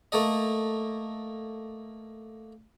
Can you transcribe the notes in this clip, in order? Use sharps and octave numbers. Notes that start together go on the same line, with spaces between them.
A3 A#3 A4 D#5